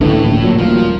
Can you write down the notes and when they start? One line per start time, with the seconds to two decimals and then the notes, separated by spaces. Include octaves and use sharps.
0.01 C#2 A2 D3 E3
0.24 D1 A#1
0.42 A#2 F#3
0.58 D#1 A#2 F3 A#3